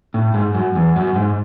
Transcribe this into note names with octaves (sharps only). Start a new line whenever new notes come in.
A2
G#2
F#2
E2
F#2
G#2